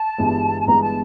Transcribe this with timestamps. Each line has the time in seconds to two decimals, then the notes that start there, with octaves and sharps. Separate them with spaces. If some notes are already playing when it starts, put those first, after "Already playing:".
Already playing: A5
0.18 G1 G2 E3 G#3 B3
0.61 A5
0.66 G1 G2 E3 G#3 B3 A#5
0.83 A5